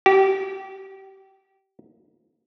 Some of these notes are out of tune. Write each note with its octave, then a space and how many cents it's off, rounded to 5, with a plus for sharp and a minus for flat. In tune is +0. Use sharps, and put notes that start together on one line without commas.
G4 -25